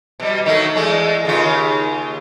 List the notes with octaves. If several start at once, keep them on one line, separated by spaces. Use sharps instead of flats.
B2 G3
D#3 F#3 A3
E2 G#3 A3
D#2 C#3 F4